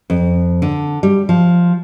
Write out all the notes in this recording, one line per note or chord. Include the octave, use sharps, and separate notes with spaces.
F2
D3
G3
F3